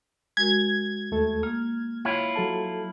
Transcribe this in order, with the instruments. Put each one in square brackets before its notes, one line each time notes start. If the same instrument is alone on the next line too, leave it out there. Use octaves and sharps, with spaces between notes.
[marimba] G#3 F#4 A#4 [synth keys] G#6
[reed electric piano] D#2 A3 A4
[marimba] A#3 [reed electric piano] F6
[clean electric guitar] E4 F4 [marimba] C#5
[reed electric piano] F#3 A4 A5